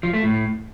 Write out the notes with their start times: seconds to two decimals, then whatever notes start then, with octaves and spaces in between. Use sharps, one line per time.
0.03 F3
0.13 A3
0.24 A2